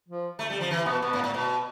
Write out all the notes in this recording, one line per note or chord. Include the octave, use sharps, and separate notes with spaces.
F3
A3
G3
F3
E3
B2 B3
B2 B3
A2
A2
B2